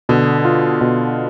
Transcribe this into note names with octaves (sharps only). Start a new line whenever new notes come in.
B2 D3
F4
B2